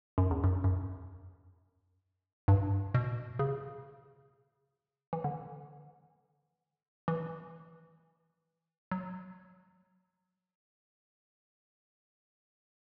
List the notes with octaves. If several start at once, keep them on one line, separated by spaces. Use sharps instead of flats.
F#2
E2
F#2
F#2
G2
B2
C#3
E3
D3
E3
F#3